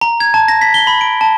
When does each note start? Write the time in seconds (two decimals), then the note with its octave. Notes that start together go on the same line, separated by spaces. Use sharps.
0.01 A#5
0.20 G#6
0.34 A5
0.48 A#6
0.61 B6
0.74 G7
0.87 B5
1.01 D7
1.21 A5